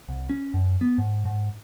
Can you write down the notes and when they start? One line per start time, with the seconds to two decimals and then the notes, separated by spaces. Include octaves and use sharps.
0.09 C2
0.29 C#4
0.54 F#2
0.81 B3
0.98 G#2
1.25 G#2